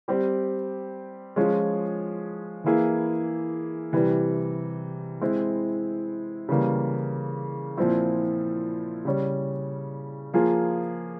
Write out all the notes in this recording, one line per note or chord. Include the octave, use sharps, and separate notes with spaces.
G3 C4 G4
F3 G#3 C#4 F4 G#4
E3 A#3 E4 G#4
C3 E3 G3
G#3 C4 E4
C#3 E3 G3 A#3
A#2 F3 C4 E4
C#3 G3 C#4
F3 A#3 F4 G#4